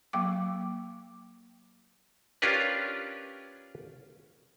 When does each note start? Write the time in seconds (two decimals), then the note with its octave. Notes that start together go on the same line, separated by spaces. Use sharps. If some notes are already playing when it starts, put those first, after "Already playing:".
0.13 F#3 A#3 G5 D6
2.42 C#4 D4 F4 G4 A#4 B4